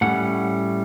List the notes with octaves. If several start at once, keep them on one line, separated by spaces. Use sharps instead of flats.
A2 G3 C#4 F#5